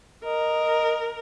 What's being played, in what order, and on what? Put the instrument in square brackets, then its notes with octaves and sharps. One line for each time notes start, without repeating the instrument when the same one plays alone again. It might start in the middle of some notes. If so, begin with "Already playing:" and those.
[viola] A#4 [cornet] D#5